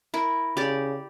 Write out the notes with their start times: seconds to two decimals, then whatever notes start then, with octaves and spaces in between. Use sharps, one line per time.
0.14 E4 A#4
0.57 C#3 G4 D5